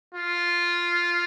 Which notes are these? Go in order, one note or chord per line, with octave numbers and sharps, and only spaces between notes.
F4